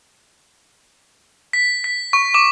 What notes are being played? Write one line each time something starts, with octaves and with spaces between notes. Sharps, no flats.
B6
B6
C#6
D6